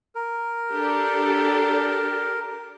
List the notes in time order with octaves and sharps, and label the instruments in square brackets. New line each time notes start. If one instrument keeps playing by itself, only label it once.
[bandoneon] A#4
[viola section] D4 G4 A4